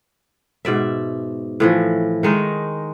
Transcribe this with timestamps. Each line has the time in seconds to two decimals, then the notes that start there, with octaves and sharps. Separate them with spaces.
0.65 G#2 B2 D5 E5
1.60 A2 E3 F3
2.23 D#3 G#3 D#4 A#4